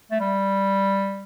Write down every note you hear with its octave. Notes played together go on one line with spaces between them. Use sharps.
A3
G3